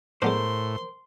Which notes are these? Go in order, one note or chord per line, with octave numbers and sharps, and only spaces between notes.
A2 G#3 B3 D4 A#4 C5 C6